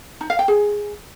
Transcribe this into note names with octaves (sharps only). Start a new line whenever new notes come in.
D#4
F5
G5
G#4